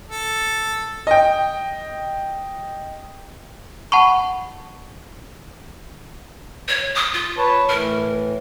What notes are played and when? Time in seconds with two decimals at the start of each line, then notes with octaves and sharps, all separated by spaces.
0.10 A4
1.07 D#5 G5
3.92 F#5 A5 B5 C#6
6.68 C#5
6.95 D#6
7.14 F4
7.38 B4 C#5 A5
7.69 A2 E3 A#4